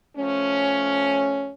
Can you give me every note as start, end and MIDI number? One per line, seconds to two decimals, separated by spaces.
0.17 1.51 53
0.17 1.51 57
0.17 1.51 61